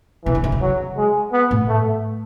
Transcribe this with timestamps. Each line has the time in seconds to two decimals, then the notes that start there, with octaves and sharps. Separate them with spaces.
0.25 B2 E3
0.35 C#3
0.44 D3
0.52 C#3
0.61 F#3
0.97 G#3
1.32 B3
1.51 A2
1.68 A3